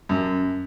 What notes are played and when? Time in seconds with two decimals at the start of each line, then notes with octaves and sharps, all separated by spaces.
0.09 F#2